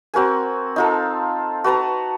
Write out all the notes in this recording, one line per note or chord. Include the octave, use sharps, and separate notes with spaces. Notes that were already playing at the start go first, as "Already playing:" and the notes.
C4 F#4 A#4 G#5
D#4 F4 A4
F#4 B4 A5 A#5